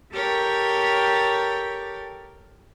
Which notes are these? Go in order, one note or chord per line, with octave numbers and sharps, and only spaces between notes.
G4 A4 A#4 C#5 G5